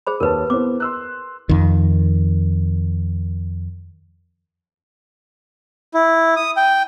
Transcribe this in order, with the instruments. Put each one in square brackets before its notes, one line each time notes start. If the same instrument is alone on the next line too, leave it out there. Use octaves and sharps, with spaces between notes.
[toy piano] G#4 C5 B5
[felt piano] D#2 C#5 A5 [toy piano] A#4 B4
[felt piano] B3 E4 C5 [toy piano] D6
[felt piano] C6 E6 F#6
[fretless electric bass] F2 D#3
[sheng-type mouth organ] E4
D#6
G5